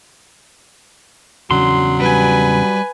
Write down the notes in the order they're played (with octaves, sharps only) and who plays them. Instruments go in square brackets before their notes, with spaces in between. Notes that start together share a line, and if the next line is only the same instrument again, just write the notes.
[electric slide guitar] E2 C#3 D4 [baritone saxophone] F#3 [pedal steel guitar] C6
[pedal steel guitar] G3 [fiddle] B4 G#5